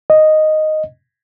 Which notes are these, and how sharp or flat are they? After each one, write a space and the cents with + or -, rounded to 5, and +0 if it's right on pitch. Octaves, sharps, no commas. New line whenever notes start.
D#5 -5